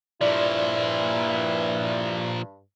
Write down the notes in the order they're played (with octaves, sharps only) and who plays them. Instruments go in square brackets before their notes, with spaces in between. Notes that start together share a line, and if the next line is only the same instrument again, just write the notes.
[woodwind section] G2 [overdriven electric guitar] A#2 F3 [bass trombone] E4 [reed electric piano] D5